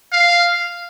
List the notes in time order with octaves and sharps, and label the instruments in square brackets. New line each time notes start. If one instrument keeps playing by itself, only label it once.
[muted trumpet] F5